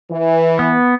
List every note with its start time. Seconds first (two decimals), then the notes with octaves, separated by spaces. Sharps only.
0.10 E3
0.59 B3